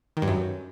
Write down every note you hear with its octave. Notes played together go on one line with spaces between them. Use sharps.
D#3
G2
F#2